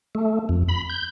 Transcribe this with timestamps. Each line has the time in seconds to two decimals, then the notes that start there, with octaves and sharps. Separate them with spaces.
0.15 A3
0.49 F2
0.68 B5
0.89 G6